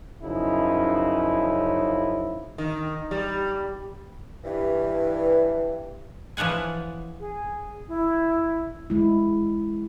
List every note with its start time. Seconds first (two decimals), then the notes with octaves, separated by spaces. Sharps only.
0.22 F#2 C#3 F3 D#4 E4
2.58 D#3
3.11 G3
4.44 G2 E3
6.37 E3 F3 C#5 F#5 G#5
7.20 G#4
7.88 E4
8.90 G#3 E4